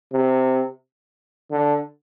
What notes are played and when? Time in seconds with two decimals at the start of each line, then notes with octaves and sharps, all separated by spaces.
0.13 C3
1.51 D3